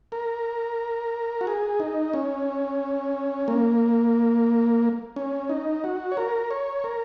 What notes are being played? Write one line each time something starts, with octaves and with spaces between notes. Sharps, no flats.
A#4
F#4
G#4
D#4
C#4
A#3
C#4
D#4
F#4
C#5
A#4
C#5
A#4